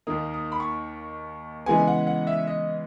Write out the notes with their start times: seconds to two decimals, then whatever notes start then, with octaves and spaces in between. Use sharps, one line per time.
0.07 D#2 D#3 A#3 D#6
0.34 D#6
0.52 B5
0.60 C#6
1.66 C#3 E3 G#3 B3 G#5
1.87 F#5
2.07 F#5
2.27 E5
2.47 D#5